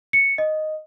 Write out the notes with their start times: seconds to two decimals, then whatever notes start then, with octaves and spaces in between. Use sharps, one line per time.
0.13 C#7
0.38 D#5